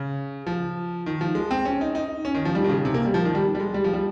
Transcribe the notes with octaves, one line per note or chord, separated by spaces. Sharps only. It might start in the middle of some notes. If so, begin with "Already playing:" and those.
Already playing: C#3
F3
D#3
F3
G#3
C4
C#4
D#4
D#4
C#4
D#3
F3
G3
D#3
C#3
C3
A#3
G3
F3
D#3
G3
G3
G#3
G3
F3
G3